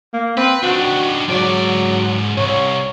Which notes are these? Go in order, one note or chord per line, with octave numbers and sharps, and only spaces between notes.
A#3
C4 B4
D#3 D4 F#4
G#2 F#3 D5
C2 C#5